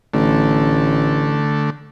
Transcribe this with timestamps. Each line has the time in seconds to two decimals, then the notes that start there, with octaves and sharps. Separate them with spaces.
0.14 A1 D3 A3